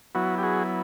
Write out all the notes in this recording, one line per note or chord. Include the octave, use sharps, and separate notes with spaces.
F#3 B3 E4 F#4
G4
F#4 G#4